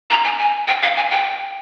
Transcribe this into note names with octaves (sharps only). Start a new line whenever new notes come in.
A#5
G#5
G#5
G5
F5
G#5
G5